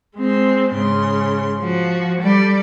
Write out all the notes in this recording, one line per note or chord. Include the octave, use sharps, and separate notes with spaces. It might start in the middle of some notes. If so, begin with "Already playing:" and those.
G#3 C4
G#2 C#3 C6
F3 F#4
G3 A4 D5